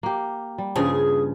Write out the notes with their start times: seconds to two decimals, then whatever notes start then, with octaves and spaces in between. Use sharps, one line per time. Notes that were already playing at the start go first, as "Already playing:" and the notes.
0.03 A#3 G4
0.58 G3
0.76 G2 C#3 F3 G#4